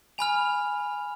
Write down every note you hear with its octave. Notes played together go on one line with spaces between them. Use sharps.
G#5 B5 F6 F7